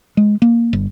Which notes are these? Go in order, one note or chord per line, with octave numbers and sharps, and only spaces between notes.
G#3
A#3
G1